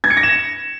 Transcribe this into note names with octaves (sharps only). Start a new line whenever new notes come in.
G#6
C#7
A#6
E7